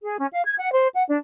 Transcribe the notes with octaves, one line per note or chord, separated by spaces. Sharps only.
G#4
C#4
F5
G#6
F#5
C5
F#5
D4